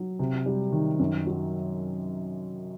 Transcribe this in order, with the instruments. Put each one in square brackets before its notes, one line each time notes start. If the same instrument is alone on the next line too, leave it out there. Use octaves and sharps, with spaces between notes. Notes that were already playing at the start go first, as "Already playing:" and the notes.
Already playing: [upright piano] F#3
C3
G3
D#3
F#2
F#3